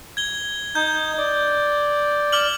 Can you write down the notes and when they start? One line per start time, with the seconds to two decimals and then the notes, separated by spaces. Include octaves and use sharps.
0.17 G#6 G7
0.75 D#4 G6
1.18 D5
2.33 D6 F6 F#7